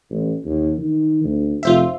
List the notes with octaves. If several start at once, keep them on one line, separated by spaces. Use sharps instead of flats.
A1
D#2
D#3
D2
F1 F4 C5 E5